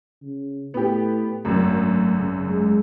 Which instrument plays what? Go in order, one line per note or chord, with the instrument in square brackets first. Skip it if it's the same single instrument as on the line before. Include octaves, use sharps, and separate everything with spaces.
[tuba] C#3
[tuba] A2 [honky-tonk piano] B3 G4
[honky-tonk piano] G#1 F#2 [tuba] A3
[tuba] C#3
G#3